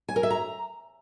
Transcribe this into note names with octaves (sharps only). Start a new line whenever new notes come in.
G#5
A#4
E5
A#5